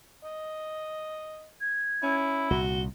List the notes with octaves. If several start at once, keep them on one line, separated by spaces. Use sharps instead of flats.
D#5
G#6
C#4 E4
C2 A#2 F#4 G7